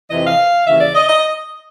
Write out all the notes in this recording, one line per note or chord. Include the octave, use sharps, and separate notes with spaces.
F2 C3 E3 D#5
F5
D#2 C#3 E3 E5
D5
D#5
D#5